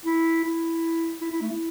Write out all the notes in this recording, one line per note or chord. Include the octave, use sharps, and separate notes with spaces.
E4
E4
E4
E4
A3
E4